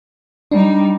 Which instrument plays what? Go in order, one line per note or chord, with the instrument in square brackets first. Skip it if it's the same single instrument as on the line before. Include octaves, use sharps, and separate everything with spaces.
[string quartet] G3 D#4 [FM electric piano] D4